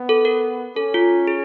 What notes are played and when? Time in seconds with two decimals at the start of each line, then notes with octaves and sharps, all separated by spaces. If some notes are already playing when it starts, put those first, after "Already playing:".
Already playing: B3
0.09 A4
0.25 A#4
0.76 C#4 A4
0.94 F4
1.27 G#4